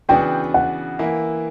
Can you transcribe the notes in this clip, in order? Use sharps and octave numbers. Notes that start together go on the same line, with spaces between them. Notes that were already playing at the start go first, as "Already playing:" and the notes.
C#3 E3 B3 D4 F#4 G5
F#5
E3 A#3 E4